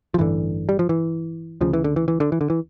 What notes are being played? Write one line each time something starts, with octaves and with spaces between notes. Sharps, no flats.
F3
A1 G2 D3 E3
G3
F3
E3
D2 C#3 F3
E3
D3
E3
E3
D3
E3
D3
E3